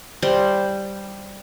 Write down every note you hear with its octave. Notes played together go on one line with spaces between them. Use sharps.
G3 C5